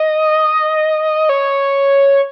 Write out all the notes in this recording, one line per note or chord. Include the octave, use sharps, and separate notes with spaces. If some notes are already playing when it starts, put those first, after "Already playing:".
Already playing: D#5
C#5